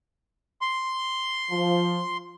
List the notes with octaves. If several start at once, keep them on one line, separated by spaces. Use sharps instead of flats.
C6
F3